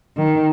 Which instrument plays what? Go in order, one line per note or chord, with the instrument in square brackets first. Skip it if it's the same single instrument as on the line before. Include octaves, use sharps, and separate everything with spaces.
[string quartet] D#3